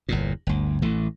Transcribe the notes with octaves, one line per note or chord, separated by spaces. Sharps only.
G1 E2 A#2
G1 D2
A1 E3 A3